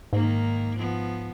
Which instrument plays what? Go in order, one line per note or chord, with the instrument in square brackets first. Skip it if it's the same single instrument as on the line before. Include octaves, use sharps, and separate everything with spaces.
[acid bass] G#2 [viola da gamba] D#3 A#3
[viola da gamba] F3 B3